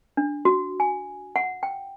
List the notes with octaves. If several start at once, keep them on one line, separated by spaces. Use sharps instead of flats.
D4
F#4
G#5
F#5
G5